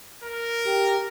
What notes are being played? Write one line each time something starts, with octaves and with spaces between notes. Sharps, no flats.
A#4
G4